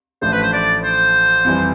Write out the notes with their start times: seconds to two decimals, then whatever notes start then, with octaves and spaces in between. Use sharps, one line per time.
0.22 A1 A2 F3 A3 D4 C5
0.32 B4
0.42 C5
0.53 D5
0.84 C5
1.45 F2 E3 G3